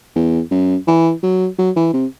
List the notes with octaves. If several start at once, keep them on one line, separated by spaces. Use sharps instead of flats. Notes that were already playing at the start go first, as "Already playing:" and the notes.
E2
F#2
E3
F#3
F#3
E3
C3